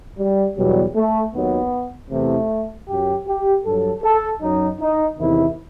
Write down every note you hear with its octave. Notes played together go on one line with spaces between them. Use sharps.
G3
E2 B2 F#3 G3
A3
D#2 D#3 F#3 B3
E2 C3 E3 A3
F#2 F#3 G4
G4
G2 F#3 A4
A4
F#2 F#3 D#4
D#4
E2 C3 D#3 E4